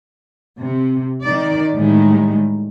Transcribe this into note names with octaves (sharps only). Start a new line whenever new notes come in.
C3
D#3 D5
A2 D#3 G3 G#3